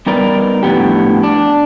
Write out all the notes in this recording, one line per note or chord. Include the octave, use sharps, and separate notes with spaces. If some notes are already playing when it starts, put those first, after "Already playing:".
G3 B3 D#4 A#4 B4 D5
A2 D3 F3 B3 C4 G4
D4